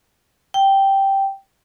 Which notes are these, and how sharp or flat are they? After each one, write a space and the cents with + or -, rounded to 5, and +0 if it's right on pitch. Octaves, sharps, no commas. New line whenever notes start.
G5 -5